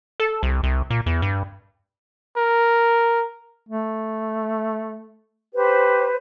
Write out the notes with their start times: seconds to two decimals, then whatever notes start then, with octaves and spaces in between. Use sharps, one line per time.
0.20 A4
0.43 C2
0.63 C2
0.90 A#2
1.06 E2
1.22 G2
2.37 A#4
3.69 A3
5.54 G4 B4 C5